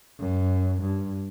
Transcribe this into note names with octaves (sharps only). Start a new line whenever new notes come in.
F#2
G2